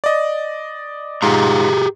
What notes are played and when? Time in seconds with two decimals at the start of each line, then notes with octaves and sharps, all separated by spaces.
0.04 D5 D#5
1.22 G#2 F4 G4 G#4 A#5